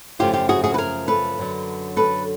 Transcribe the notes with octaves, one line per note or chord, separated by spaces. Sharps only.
F#2 C#3 F3 A3 F4 G4
F4 G4
F#4 G#4
F#4 G#4
B4
G#4 A#4
A4 B4
F#2 D3 F#3
A4 B4